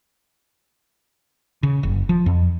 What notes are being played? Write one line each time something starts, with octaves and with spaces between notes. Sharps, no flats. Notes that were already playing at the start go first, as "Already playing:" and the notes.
C#3
F#1
F3
F2